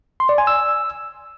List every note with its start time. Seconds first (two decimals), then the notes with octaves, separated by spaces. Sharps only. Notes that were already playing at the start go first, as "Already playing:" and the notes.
0.20 C6
0.29 D5
0.38 G#5
0.47 E6